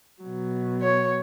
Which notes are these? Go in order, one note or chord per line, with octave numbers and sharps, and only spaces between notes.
B2 F#3
C#5